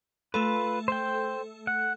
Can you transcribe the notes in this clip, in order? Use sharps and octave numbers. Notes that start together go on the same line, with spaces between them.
A3 F4 A4 B4
C5 G5
F#5